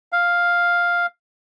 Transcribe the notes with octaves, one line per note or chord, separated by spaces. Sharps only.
F5